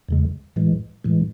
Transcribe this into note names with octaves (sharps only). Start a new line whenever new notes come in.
E2 C#3 G#3
A2 E3 G#3
A2 E3 G#3